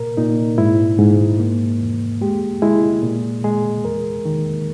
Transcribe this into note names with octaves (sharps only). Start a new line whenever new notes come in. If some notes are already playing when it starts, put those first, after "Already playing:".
Already playing: A#2 A#4
A#2 D#4
G#2 E4
G#2
A#3
E2
G#3 G4
G#3 E4
A#2
G#3 G#4
E2 A#4
D#3